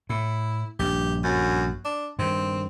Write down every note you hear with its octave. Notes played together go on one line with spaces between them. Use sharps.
A2 E4
A#1 G2 G4
F#2
D4
G2 D#3 C4